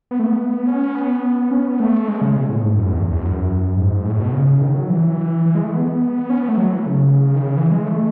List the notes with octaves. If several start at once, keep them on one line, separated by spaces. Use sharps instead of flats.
B3
A3
B3
C#4
B3
C#4
B3
A3
G#3
C#3
B2
A2
G#2
G#2
F#2
E2
E2
F#2
G#2
A2
B2
C#3
D#3
F#3
E3
E3
G#3
A3
B3
C#4
B3
A3
F#3
E3
C#3
D#3
C#3
E3
G#3
A3